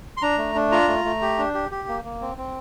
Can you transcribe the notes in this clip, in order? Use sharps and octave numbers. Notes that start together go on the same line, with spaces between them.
C6
D4 A#5
A3
D4
F4 A#5
A3
A3
G4
D4
G4
G4
A#3
A#3
C4
C4